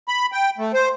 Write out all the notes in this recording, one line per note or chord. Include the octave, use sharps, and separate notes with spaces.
B5
G5
A3
C5